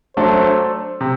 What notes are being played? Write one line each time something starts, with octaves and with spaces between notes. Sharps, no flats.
F#3 A3 D4 A4 C5
C3